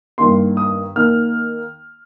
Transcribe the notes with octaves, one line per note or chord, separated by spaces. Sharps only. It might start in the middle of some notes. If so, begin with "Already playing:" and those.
G2 D#3 A#3 C6
D#6
D#3 A#3 F6